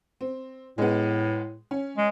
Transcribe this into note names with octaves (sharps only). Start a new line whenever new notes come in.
C4
A2 G#3 B3
C#4
G#3